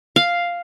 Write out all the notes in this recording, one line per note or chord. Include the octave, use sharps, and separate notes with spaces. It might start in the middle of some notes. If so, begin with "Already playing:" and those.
F5